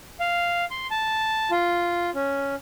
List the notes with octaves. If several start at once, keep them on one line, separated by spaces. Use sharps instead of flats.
F5
C6
A5
F4
C#4